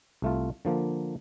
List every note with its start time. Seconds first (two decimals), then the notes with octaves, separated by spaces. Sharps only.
0.22 C2 A3 F4
0.65 D3 F3 A#3